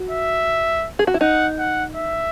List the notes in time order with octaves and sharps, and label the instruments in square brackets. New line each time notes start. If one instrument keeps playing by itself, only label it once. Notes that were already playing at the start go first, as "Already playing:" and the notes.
Already playing: [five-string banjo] F#4
[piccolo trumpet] E5
[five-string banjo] G#4
F#4
E4
[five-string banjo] D#4 [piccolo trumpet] F#5
[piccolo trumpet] F#5
E5